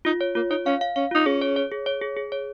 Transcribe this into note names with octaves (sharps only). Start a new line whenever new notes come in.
D#4 F4
C#5
A#3 F4
D#4 C#5
C#4 F5
F5
C#4 F5
D#4 F4
C#4 G#4
C#5
C#5
G#4
C#5
G#4
G#4
C#5